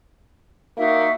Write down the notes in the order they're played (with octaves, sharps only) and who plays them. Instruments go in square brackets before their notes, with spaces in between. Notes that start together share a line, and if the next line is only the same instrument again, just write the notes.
[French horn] A#3 [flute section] D#4 F#4 E5